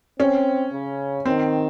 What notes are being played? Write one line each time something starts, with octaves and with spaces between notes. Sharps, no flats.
C4 C#4
C#3
D#3 C4